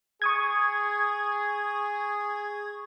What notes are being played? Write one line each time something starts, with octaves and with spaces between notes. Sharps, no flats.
G#4 C#6 D#6 G#6